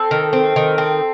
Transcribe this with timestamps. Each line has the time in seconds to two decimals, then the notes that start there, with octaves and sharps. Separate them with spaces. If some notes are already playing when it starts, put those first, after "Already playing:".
Already playing: C4 A4
0.11 D#3
0.33 C4
0.56 D#3
0.78 C4